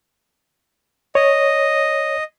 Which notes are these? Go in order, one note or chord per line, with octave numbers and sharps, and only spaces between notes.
C#5 D#5